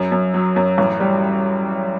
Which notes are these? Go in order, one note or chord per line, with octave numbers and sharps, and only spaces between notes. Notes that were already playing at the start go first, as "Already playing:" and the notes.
Already playing: F#2
F#2
F#3
F#2
A1
G3